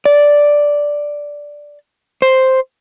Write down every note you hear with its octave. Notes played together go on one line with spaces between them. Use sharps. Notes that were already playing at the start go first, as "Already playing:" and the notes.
D5
C5